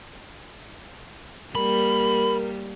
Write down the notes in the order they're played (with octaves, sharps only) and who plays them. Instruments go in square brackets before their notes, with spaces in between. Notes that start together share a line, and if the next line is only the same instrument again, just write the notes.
[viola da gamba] G3 A#3 [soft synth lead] A#4 [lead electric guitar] B5